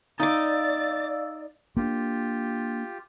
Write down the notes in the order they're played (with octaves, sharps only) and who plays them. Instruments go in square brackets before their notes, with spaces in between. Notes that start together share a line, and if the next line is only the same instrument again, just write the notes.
[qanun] D#4 D6 [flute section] D5 [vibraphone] F5 E6 [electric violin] A6
[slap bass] A#3 D4 [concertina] F4 G4